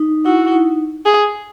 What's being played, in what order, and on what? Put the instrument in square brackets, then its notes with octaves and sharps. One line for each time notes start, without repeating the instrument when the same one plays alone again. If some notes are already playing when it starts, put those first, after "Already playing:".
Already playing: [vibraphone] D#4
[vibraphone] E4 [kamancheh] F#4
[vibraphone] E4
D#4
[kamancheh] G#4